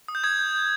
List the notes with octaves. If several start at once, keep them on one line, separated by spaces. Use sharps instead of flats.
D#6
G6
D#6 G#6
G6
G6